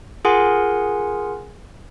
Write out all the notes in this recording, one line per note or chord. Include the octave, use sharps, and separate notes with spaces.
F4 G#4 A#4 F#5 G#5 C6